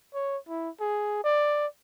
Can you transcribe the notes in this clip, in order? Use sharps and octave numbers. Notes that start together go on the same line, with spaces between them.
C#5
E4
G#4
D5